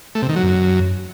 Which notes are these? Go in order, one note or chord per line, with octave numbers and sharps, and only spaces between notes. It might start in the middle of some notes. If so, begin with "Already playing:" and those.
A3
C3
D#3
F#3
F#2